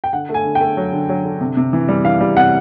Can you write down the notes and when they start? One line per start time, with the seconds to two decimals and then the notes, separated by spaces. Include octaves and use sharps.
0.04 G5
0.13 D3 F#5
0.29 A3
0.34 G#5
0.45 D3
0.55 A3 G5
0.77 F#3
0.93 D3
1.09 F#3
1.25 D3
1.41 C3
1.57 C3
1.73 E3
1.88 G3
2.05 E3 F5
2.21 G3
2.37 C3 F#5